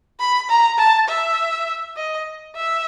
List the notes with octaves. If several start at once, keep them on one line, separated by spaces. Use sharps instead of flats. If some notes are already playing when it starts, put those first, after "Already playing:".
B5
A#5
A5
E5
D#5
E5